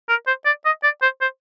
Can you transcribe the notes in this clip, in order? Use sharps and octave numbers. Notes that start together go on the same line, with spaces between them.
A#4
C5
D5
D#5
D5
C5
C5